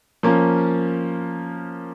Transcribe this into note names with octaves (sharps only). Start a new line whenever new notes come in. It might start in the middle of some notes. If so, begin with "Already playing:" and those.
F3 A#3 C#4